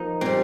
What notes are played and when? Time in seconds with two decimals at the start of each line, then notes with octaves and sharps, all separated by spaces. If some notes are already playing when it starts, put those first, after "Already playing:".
Already playing: F3 A#3 D#4
0.21 A#2 G3 C4